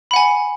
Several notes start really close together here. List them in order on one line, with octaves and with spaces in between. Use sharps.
B5 F#5 G#5